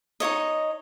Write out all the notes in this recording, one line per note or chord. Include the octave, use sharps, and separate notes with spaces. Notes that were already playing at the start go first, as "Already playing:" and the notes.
D#4 F#4 C#5 D#5